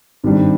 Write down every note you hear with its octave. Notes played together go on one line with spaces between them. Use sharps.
G#1 G2 D#3 G3 D4